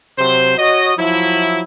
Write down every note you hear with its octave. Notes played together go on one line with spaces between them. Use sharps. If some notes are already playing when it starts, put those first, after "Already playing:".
C3 F#3 C5
F#4 C#5 D#5
F3 F#3 E4